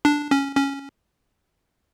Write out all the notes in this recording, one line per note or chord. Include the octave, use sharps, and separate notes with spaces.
D4
C#4
C#4